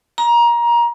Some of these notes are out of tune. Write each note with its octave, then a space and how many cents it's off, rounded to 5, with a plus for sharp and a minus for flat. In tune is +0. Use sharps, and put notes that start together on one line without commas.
A#5 +20